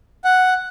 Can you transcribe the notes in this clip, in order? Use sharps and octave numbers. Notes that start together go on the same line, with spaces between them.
F#5